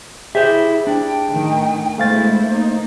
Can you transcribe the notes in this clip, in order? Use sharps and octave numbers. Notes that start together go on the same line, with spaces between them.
E4 G4 G#4 C5 E5
D4 G5
A2 D#3
B2 G#3 A3 E4 C5 F5 A6
A#3 D#4